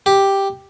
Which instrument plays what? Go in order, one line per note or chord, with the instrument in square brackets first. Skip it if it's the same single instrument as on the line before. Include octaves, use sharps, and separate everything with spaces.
[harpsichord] G4